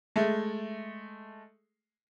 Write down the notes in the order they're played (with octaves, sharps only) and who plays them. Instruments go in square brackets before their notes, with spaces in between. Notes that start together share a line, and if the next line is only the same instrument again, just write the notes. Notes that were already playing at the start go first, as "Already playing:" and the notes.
[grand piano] G#3 A3